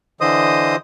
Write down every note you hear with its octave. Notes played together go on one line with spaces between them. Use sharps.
D3 E3 C5 D#5 D#6